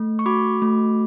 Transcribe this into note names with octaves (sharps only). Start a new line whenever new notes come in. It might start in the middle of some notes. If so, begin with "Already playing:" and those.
Already playing: A3
C#6
F#4 B5 D6
A3